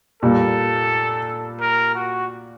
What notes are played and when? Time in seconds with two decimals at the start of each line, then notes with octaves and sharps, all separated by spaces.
0.23 A#2 G3 A#3 A4
1.61 A#4
1.95 F#4